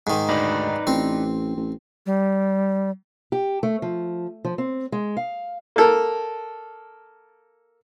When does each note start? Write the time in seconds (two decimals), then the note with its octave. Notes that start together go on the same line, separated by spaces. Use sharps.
0.07 G#2 D#3
0.29 D2 D#4 B4 D5
0.87 A1 C4
1.57 A1
2.06 G3
3.32 G4
3.63 A3
3.82 F3
4.45 F3
4.58 C4
4.92 G#3
5.17 F5
5.76 A#3 A4 A#4